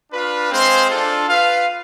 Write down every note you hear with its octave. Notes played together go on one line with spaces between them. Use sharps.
D4 F4 B4 F5
G#3 C4 G#4 C5 F5
D4 F4 A4
F4 B4 F5